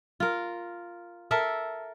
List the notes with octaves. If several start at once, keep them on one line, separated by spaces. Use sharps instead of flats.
F4 A#4
A4 A#4 E5